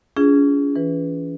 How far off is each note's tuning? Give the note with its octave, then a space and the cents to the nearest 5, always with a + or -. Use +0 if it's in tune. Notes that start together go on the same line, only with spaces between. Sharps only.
C#4 +40 F4 -20 G#4 +0
E3 +0 B4 +0